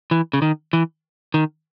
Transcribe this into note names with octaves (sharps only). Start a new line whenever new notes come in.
E3
C#3
D#3
E3
D#3